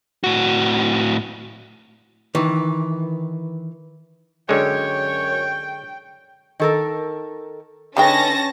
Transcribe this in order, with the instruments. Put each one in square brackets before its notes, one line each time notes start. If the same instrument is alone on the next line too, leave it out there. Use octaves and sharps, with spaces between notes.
[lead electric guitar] A2 F#4
[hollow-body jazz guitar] D#3 E3
[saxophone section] F#2 C#5 [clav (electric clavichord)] D3 G#3 [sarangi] G5
[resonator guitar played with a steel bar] D#3 A4 A#4
[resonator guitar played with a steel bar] D3 B4 [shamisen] D#3 G#3 G5 [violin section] C#4 A5 A#6